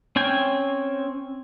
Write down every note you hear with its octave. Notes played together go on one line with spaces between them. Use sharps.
C4 C#4 G5 G#5